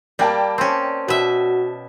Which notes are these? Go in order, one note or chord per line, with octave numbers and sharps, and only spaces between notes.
G3 A#3 D5 G5 A5
C4 C#4
B2 F#4 E5